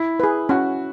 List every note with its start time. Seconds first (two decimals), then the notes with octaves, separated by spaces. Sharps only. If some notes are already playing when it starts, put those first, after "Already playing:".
Already playing: E4
0.20 G#4 B4
0.49 C#4 F#4